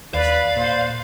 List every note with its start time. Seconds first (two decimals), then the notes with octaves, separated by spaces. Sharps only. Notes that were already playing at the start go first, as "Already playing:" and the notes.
0.14 D#2 B4 D5 F5
0.56 A#2 C5